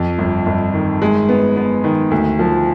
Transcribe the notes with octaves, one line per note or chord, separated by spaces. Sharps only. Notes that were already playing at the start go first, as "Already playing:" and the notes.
Already playing: F2
G1
G1
D#3
G#3
B3
B3
D#3
D2
F3